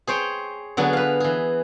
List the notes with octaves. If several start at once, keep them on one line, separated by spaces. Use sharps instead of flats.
G#4 C5 C#5 G5
D3 F#3 B3 G#4
B4 F5
E3 G#4